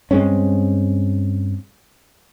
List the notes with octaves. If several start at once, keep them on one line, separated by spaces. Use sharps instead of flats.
G2 G#3 C4 C#4